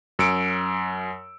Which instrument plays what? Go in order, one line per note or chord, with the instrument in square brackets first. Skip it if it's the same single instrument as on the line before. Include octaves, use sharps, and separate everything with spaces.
[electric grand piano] F#2 E6 C#7 D7